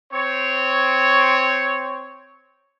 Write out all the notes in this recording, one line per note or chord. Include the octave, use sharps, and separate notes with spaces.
C4 C#5